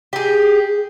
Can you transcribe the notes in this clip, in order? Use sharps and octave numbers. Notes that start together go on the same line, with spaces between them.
G4 G#4